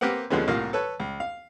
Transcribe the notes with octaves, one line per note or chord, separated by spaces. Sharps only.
A#3 C4 G4 A#4 B4 F#5
D#2 D3 F3 G#3 B3 C#4
C2 A2 A#3 F4
A4 B4 C#5
C#2
F5